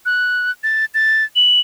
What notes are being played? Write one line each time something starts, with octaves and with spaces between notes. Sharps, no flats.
F#6
A6
A6
F#7